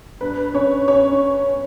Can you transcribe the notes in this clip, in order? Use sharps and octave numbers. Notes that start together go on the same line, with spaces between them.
G2 B4
C#4 C#5
C#4 C#5